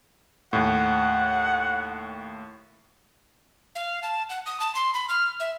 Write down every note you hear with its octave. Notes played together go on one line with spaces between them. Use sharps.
D#2 A2 F#5
F5
A5
F#5
D#6
A5
C6
B5
F6
E5